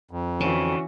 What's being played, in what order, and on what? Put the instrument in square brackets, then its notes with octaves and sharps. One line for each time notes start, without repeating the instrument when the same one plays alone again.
[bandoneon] F2
[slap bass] D3 [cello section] E3 F#4 [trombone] C#4